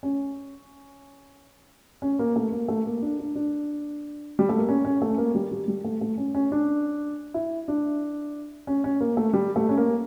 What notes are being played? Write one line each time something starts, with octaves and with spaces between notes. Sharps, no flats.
C#4
C#4
A#3
A3
A#3
A3
A#3
D4
D4
D4
G3
A3
A#3
C#4
C#4
A3
C#4
A#3
G3
G3
G3
A3
A3
C#4
C#4
D4
E4
D4
C#4
C#4
A#3
A3
G3
A3
C#4
A#3